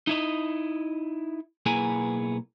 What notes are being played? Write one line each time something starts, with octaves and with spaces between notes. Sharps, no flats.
D#4 E4 D#5
B1 A#3 B3 E4 G#4 G#5